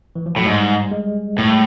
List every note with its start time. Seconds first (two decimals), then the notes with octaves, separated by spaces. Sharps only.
0.16 E3
0.26 F3
0.36 A2 F#3
0.46 G#2 G3
0.91 G#3
1.38 A2 A3